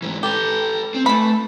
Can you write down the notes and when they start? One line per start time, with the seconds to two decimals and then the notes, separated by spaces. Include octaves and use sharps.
0.02 G#2 E3
0.23 G4 A4 B4
0.94 C4
1.06 E3 A3 B5